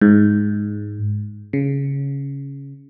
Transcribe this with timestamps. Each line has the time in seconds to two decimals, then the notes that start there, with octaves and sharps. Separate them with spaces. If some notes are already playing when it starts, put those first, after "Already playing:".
0.02 G#2
1.53 C#3